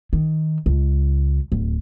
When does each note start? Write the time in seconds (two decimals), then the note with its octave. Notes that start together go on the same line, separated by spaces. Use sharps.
0.13 D#3
0.66 C#2
1.52 D1